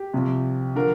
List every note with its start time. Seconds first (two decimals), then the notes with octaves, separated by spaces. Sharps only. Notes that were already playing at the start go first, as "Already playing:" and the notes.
Already playing: G4
0.13 C2 C3 F3
0.76 D3 F3 A#4